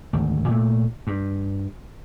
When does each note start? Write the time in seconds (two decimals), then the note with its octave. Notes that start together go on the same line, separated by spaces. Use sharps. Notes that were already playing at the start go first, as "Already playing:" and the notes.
0.13 G#1 D2
0.48 A#2 A3
1.07 G2